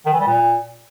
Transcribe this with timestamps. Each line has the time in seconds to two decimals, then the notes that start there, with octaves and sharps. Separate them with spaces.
0.06 D#3
0.13 E3
0.20 G3
0.27 A#2